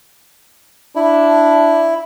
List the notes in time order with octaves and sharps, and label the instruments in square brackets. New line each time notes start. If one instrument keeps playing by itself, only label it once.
[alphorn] D4 [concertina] E4